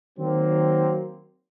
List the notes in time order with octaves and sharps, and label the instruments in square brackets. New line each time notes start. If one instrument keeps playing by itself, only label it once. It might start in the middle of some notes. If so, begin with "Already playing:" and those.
[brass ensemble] D#3 F#3 A#3 C4